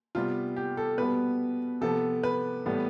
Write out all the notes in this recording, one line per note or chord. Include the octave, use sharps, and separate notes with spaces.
C3 G3 B3 F4
G4
A4
B2 G3 B3 B4
C3 F3 B3 A4
B4
A2 E3 G3 B3